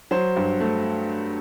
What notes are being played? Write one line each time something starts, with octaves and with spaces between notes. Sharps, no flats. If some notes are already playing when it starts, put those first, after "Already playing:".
F#3 C5
G2
A3